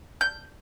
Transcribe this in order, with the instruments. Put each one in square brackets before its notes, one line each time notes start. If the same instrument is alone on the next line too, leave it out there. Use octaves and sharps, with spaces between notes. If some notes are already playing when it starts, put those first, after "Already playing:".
[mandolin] G6